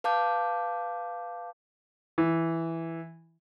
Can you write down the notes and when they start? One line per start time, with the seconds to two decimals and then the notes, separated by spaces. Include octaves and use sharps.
0.04 B4 F5 A5 D6 G6
2.18 E3